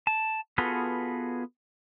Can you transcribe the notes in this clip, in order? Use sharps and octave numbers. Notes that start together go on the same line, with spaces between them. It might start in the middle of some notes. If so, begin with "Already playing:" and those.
A5
B3 F4 F#4 G#4 A4 B4